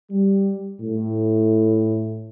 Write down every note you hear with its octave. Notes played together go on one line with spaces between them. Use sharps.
G3
A2